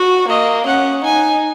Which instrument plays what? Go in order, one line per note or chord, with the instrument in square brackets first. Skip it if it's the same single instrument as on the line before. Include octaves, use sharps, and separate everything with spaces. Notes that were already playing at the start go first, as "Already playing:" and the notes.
Already playing: [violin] F#4
[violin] A#3 [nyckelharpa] D#5
[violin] C#4 [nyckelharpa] F#5
[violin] D#4 [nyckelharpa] G#5